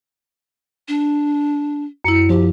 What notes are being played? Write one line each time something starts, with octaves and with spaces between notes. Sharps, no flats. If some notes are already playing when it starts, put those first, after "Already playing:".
D4
F#2 E4 C#7
F3 G4